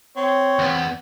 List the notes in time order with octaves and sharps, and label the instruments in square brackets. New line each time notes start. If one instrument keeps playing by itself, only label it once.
[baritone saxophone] C4 [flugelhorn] C#5
[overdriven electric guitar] E2 B3